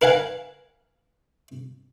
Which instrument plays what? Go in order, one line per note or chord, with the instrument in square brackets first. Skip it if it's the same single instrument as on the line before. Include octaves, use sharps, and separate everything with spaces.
[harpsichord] A#4 B4 F5 F#5 G#5 A#5